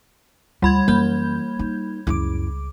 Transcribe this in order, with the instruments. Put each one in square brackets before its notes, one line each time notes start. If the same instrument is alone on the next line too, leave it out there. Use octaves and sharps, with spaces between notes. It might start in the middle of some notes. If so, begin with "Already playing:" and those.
[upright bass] D2 F#3 [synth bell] G3 B5 G#6
[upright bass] F#2 E3 [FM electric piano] A#3 G6
[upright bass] D#4
[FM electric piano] C#2 D6 [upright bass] F#2 E4